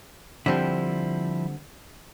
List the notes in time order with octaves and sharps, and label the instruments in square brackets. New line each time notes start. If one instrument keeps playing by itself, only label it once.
[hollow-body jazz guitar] D3 G3 C4 [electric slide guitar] F3 E4